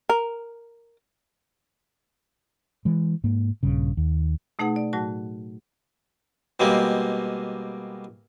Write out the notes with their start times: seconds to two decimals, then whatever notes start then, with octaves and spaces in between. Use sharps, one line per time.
0.09 A#4
2.85 E3 G#3
3.24 G#2 A#3
3.63 A#1 G2 C#3
3.97 D#2
4.59 B2 A3 D#4 G#4 F#5
4.76 D5
4.93 A2 F#3 F#4 A5
6.60 B2 G3 G#3 A#3 C4